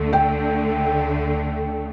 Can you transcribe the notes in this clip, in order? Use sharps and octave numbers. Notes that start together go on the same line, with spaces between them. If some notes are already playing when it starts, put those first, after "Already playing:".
Already playing: D2 D3 A3
G5